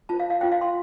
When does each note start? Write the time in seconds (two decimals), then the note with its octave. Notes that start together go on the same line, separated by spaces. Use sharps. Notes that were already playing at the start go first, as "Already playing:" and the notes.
0.09 F4 C5 A5
0.20 F5
0.30 F5
0.41 F4 C5 G5
0.52 F5
0.61 C6